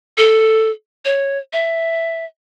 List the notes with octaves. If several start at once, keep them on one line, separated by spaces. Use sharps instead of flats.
A4
C#5
E5